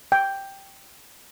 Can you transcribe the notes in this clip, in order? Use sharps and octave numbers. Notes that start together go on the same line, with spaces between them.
G5